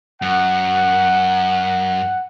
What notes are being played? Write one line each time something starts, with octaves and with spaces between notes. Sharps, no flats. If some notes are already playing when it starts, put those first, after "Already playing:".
F#2 F#5